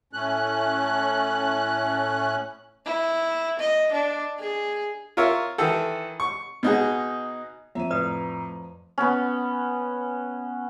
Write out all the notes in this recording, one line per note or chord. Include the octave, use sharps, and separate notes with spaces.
A2 A3 C#4 F#6
E4
D#5
D4
G#4
F4 A#4 C#5 E5
D#3 E3 A4
C#6
B2 D#4 F#4 G#4
F2 E5 A#5 D#7
A2 B4 D5 D#6
B3 C#4